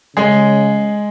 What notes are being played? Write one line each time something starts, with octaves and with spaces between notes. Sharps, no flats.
C#3 G#3 G#4